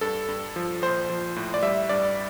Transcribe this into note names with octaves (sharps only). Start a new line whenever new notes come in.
G2 A4
G2
F3
A#1 C5
F3
A2
D5
G3 E5
G2 D5